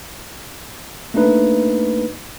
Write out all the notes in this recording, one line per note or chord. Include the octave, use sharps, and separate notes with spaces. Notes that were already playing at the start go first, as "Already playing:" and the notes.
A3 A#3 D4 D#4 B4